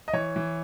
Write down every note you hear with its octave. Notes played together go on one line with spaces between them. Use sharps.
D#5
E3 C#5
E3